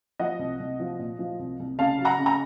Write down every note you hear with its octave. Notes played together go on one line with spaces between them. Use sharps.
F3 D#5 F#5
C2
C2
F3
A#2
F3
C2
C2
C#3 F5 A5
F#3
F#5 A#5
C#3
A#5